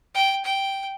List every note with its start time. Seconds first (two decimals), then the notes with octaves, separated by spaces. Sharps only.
0.14 G5
0.44 G5